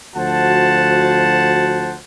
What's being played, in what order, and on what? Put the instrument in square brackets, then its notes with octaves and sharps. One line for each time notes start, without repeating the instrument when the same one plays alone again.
[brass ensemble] D2 F3 F#4 C5 F#5 A5